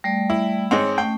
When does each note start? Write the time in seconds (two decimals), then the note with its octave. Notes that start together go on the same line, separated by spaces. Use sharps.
0.04 G3 A3 D5
0.30 E4
0.71 G#2 G#3 C4 C#5
0.98 A3 C#4 G5